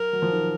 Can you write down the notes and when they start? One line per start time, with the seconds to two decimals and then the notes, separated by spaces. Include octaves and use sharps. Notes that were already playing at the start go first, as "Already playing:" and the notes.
Already playing: F#3 A#4
0.13 F#3
0.22 F3
0.32 D#3